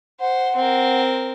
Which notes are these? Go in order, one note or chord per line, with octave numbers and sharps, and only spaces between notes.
C5 F#5
C4 A#4